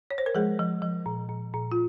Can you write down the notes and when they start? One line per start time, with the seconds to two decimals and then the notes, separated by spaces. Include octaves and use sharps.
0.11 C#5
0.18 C5
0.26 A#4
0.35 F3 G#3 G#4
0.59 F3
0.82 F3
1.06 A#2
1.29 A#2
1.54 A#2
1.72 F4